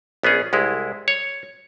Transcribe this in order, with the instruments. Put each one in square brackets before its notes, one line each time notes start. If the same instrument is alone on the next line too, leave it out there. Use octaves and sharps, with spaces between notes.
[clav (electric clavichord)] A#1 B3 C#4 G#4
C2 G#3 E4
C#5